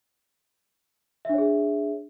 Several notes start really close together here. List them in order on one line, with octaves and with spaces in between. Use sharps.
E5 D4 C#5 G#4